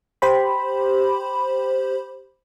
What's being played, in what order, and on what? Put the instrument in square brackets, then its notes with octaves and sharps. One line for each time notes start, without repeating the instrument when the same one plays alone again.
[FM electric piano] G4 C5 B5